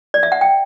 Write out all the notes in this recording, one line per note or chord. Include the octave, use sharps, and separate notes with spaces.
D5
E5
F#5
G5